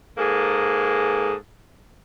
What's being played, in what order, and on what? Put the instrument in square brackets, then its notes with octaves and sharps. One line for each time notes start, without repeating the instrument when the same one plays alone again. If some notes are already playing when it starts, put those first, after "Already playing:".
[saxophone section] G#2 A#3 G#4 A4